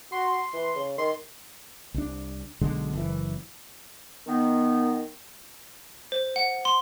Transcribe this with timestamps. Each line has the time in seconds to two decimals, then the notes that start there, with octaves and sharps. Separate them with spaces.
0.12 F#4 C6
0.53 E3
0.76 C#3
0.98 D#3 C6
1.94 C2 D4
2.61 B1 B2 D3 G#3
2.93 F#1 E3
4.27 D#3 B3
6.12 C5
6.36 F#5
6.65 C6